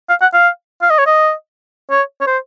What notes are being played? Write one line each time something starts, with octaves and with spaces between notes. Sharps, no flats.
F5
F#5
F5
F5
D#5
C#5
D#5
C#5
C#5
C5